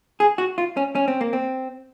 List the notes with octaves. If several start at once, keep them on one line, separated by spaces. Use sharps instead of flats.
G#4
F#4
F4
C#4
C#4
C4
A#3
C4